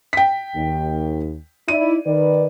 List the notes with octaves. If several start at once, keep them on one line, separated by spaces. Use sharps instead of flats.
G5 B6
D#2
D#4 E4 D5 D#7
D#3 B4 D5